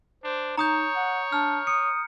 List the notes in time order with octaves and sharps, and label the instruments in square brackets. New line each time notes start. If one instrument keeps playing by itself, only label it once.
[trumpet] D4 [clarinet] C5
[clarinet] D#4 [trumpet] C#5 [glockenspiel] A#5 D#6 G6
[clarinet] F#5
[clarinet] D4 [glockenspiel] F6
[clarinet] D#6 [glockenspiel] C#7